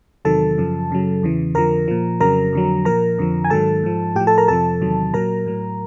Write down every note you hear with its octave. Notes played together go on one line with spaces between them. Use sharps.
E2 C3 D#3 F#3 A4 A5
F#2 C#3 F3
F#2 C#3 F#3
E2 C#3 E3
F2 D3 F3 A#4 A#5
A#2 F3
F2 C#3 F#3 A#4 A#5
F2 D3 F#3
A#2 F3 A#4 A#5
F2 D3 F3
G#5
G#2 D#3 F#3 A4 A5
G#2 F3
A2 F3 G4 G5
A4 A5
A#4 A#5
F2 C3 F3 A4 A5
E2 C3 D#3 F#3
A#2 F#3 A#4 A#5
A2 F#3